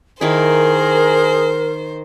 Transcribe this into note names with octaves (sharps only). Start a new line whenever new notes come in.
D#3 E4 G#4 A#4 C5